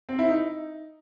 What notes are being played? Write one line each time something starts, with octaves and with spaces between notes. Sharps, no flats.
C4
E4
D#4